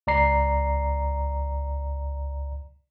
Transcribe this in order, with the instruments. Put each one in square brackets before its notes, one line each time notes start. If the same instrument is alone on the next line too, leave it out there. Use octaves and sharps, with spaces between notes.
[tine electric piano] C#2 D5 A#5 C7